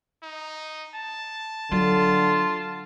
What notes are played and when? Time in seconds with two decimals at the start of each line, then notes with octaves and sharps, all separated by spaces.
0.23 D#4
0.95 A5
1.72 D3 F#3 F4